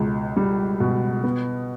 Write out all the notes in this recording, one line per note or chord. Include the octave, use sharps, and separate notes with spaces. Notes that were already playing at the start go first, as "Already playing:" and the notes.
Already playing: C#2 B2
G3
B2
B3